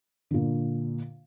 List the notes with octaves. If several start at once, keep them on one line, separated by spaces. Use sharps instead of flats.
A#2 D3